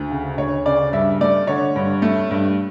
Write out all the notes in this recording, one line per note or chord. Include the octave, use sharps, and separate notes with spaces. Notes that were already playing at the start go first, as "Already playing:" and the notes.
Already playing: D2
C#3
D2 C#5
C#3 D5
G2 E5
A3 D5
D3 C#5
G2
A3
G2